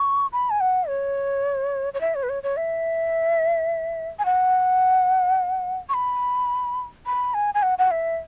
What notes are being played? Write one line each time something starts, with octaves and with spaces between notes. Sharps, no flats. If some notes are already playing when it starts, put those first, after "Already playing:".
Already playing: C#6
B5
G#5
F#5
C#5
C#5
E5
C#5
B4
C#5
C#5
E5
G#5
F#5
C#6
B5
B5
G#5
G#5
F#5
F#5
E5